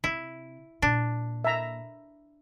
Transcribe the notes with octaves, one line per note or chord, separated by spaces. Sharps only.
C3 E4
A#2 D4
E5 A#5